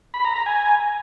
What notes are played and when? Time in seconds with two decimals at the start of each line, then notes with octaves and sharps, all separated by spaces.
0.14 B5
0.25 A#5
0.35 A#5
0.46 G#5